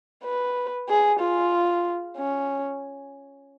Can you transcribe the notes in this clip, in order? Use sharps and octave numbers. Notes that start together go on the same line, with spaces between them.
B4
G#4
F4
C#4